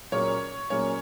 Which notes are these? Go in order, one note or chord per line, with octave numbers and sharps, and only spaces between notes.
A#2 F#3 A#3 C#4 G#4 C#5
A#2 F#3 A#3 C#4 G#4 C#5